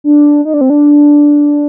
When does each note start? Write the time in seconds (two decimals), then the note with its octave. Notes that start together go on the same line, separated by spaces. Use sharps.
0.04 D4
0.45 D#4
0.54 D4
0.61 C4
0.70 D4